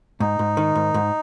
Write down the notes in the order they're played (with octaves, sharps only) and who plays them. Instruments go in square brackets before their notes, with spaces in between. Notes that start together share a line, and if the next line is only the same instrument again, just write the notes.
[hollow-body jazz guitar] G#2 [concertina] D#4
[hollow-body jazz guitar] G#2
D#3
G#2
G#2